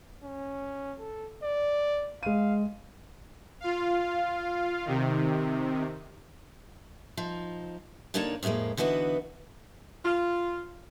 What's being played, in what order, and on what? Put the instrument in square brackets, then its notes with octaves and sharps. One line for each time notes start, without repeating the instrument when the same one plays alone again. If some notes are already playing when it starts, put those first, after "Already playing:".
[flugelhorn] C#4
A4
D5
[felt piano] G#3 D#7 [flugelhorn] F5
[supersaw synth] F4 F5
C3 D#3
[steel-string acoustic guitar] F3 D#4
D3 A#3 D#4 C#5 D5 A5
F2 A2 E3 G#3 A#3
D3 E3 B3 D#4 F#4
[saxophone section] F4